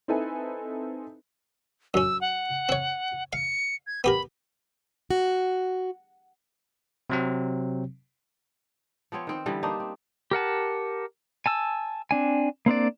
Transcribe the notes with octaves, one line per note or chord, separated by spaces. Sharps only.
C4 D#4 E4 A4 B4 G#5
F#2 C#4 E6
F#5
C4 C#5
F5 C#7
G#6
B3 G4 A#4 B5
F#4
C3 F#3 C4
F3 B3 C4 C#5
D#3 C4 C5
D3 E3 G3 B3
A#3 D4 D#4 C5
C4
G4 A#4 F#5 A5
G#5 A5 E6
C4 D4 G#5
A#3 C4 D4 D5